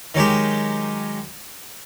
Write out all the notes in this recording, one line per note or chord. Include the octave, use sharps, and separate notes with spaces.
D#3 F#3 G#3 G4